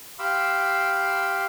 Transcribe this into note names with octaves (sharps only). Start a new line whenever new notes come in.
G4 F5 B5 C6 D6 E6